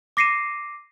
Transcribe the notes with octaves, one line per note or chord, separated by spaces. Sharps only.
D6 A#6 C7 C#7 D#7 E7